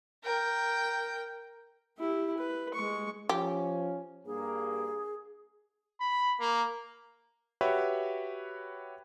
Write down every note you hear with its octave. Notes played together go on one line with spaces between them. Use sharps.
A#4 G5
E4 G4
B4
G#3 C#6
F3 C#4 G4
G2 A#3 G#4
B5
A#3
F#4 G4 B4 C#5 E5